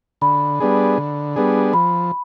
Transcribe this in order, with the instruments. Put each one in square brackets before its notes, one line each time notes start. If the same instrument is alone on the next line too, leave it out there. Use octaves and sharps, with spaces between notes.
[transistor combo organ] D3 [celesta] B5
[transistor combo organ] G3 B3 D4 G#4
D3
G3 B3 D4 G#4
[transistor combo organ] F3 [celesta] B5